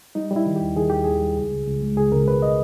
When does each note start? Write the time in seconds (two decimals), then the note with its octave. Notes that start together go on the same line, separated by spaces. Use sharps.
0.15 G3 D#4
0.31 G3
0.36 E4
0.46 D#3
0.56 G4
0.61 D#2
0.76 D#3 G#4
0.90 D#2 G4
1.04 D#2 G#4
1.22 G3
1.37 C#2
1.52 C#2
1.67 C#2
1.82 G#3
1.97 C#2 G#4
2.12 C#2 A#4
2.27 B2 B4
2.42 D#5